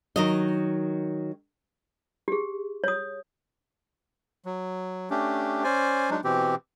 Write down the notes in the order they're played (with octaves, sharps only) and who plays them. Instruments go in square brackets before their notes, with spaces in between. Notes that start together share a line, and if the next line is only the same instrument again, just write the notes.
[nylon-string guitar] D#3 F#3 D#5
[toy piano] G4 G#4
C#5 D#6
[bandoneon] F#3
A3 C#4 D4 G4
C#4 C5 D5 G#5
F#3 G#3 D4 D#4
B2 E3 C4 G4